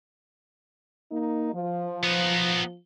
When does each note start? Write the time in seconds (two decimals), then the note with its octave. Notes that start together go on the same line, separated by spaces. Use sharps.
1.12 A#3 D#4
1.53 F3
2.03 B3 D#4